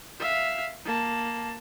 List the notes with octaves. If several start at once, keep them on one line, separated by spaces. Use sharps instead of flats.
E5 F5
A#3 A5